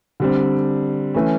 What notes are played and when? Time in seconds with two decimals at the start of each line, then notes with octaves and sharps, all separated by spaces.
0.20 D3 G3 C4
1.14 E3 A3 C#4